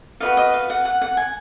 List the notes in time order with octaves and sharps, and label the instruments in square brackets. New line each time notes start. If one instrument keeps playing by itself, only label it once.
[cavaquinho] F#4 B4 D#5 F5
D#5
F5
F#5
F#5
F#5
G#5